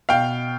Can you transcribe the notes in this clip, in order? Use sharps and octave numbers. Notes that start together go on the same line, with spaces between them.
B2 F5 G5